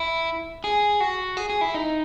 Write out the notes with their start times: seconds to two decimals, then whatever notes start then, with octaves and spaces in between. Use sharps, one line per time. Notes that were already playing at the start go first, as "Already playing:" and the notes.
Already playing: E4
0.64 G#4
1.00 F#4
1.37 G#4
1.50 G#4
1.61 E4
1.74 D#4